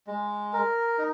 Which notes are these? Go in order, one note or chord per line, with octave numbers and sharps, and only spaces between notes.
G#3
A#4
D#4